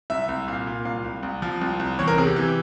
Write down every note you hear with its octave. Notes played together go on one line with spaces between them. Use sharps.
C2 E5
C2
A#2 F5
A#2
C2 F5
C2
C2
F3
C2
C2
E2 C#5
A#4
C3 G#4
G4
E3